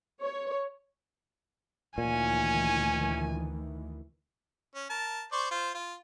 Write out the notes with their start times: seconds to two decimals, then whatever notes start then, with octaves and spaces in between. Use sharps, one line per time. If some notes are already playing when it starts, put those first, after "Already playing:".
0.22 C#5
1.98 D2 A#2 D#3 E3 C#4 G#5
4.75 C#4
4.90 A#4 A5
5.32 C5 D5 C#6
5.51 F4 C5
5.74 F4